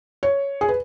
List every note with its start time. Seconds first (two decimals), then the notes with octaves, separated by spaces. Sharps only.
0.23 C#5
0.61 G#4
0.69 B4